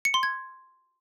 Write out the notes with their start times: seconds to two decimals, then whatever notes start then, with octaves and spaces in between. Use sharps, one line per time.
0.05 C#7
0.14 C6
0.23 G#6